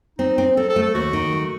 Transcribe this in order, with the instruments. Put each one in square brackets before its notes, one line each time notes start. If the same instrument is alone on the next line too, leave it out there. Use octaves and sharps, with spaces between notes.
[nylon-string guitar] C4 [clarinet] D#4
[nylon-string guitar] C4
[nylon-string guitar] C4 [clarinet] A4
[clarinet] A4
[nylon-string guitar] A3
[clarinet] A4
[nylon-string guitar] D#2 [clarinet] F#4
[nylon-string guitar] D#3
A3